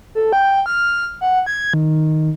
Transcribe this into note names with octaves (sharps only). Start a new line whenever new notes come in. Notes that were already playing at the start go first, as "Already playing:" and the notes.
A4
G5
F6
F#5
G#6
D#3